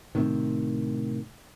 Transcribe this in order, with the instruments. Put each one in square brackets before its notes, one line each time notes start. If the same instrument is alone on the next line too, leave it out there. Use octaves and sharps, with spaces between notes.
[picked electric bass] A2 C3 D#3